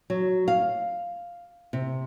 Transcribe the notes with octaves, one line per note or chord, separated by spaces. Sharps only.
F#3
F5
C3